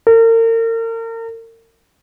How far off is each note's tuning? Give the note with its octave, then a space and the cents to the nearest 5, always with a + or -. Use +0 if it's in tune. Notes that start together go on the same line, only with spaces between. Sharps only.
A#4 -40